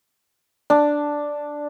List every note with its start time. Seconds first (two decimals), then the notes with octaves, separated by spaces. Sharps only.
0.70 D4